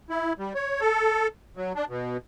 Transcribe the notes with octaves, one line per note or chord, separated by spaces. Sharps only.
E4
G3
C#5
A4
F#3
D4
B2